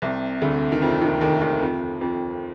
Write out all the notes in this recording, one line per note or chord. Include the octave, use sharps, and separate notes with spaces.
C2 C3
D2 D3
D#3
F2 F3
D#2 D#3
D#2 D#3
D#2 D#3
F2 F3
F2 F3